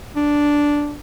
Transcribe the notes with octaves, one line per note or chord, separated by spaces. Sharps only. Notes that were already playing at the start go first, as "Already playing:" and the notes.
D4